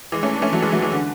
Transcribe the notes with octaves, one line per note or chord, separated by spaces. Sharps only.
E3 G#3
A3 C#4
D4
A3 C#4
F#3 A3
E3 G#3
F#3 A3
E3 G#3
D3